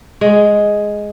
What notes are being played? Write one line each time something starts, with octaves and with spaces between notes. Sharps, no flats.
G#3